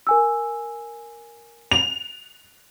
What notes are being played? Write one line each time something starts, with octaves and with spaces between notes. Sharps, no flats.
A#4 G#5 E6
F7